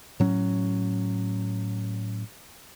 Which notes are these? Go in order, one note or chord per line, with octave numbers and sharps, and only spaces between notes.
A2 F#3 C#4